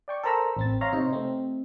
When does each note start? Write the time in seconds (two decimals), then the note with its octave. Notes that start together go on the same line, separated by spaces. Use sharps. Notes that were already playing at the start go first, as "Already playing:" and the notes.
0.08 D5 G5 C#6
0.23 A4 A#4 C5 A#5 B5 E6
0.56 A1 C4 A6
0.81 C#5 E5 F5 A#5 C6
0.93 C3 D#4 C5
1.13 A3 C4